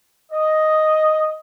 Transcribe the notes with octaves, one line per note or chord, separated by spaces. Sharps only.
D#5